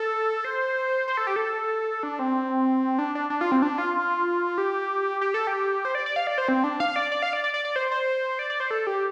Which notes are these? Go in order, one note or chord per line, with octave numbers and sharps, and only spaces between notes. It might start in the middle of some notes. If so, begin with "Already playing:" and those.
Already playing: A4
C5
C5
A4
G4
A4
D4
C4
D4
D4
D4
F4
C4
D4
F4
G4
G4
A4
G4
C5
D5
D5
F5
D5
C5
C4
D4
F5
D5
D5
F5
D5
D5
D5
D5
C5
C5
D5
D5
C5
A4
G4